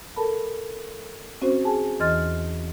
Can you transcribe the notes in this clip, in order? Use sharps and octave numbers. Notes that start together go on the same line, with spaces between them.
A4 A#4 A5 B5
C4 C#4 F#4 C5
G#4 G#5 A5
E2 E3 D#5 C6 F6 A6